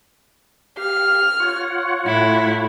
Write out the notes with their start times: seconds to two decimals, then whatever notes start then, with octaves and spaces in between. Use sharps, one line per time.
0.77 G4 F5 F6
1.40 F4 C#5 F#5
2.05 A2 E4